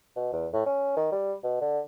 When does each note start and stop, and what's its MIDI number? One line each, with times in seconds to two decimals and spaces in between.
0.16 0.29 47
0.33 0.47 40
0.53 0.64 45
0.66 0.93 61
0.97 1.07 51
1.12 1.34 55
1.43 1.61 47
1.61 1.79 50